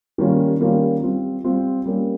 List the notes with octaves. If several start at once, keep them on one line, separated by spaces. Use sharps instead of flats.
D#3 G3 A#3 C#4 F4
D#3 G3 A#3 C#4 F4
G3 C4 F4
G3 C4 F4
G3 A#3 C#4